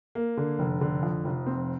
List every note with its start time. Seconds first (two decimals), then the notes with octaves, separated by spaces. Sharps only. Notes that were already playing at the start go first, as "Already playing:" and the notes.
0.15 A#3
0.37 D3
0.59 F1
0.81 D3
1.03 F2
1.25 F1
1.47 C4